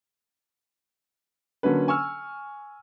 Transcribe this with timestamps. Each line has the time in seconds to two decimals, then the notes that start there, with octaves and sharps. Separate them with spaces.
1.63 D3 F#3 A#3 C#4 B4
1.88 G#5 C#6 E6 F6